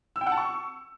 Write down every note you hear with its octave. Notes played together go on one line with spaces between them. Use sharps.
E6
G5
F#5
A5
C#6